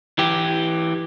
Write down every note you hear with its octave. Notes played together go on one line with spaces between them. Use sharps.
E3 G4